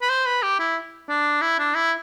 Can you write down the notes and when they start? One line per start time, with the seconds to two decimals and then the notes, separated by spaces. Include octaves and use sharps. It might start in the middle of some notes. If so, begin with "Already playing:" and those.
0.02 B4
0.10 C5
0.26 B4
0.42 G4
0.59 E4
1.09 D4
1.42 E4
1.59 D4
1.75 E4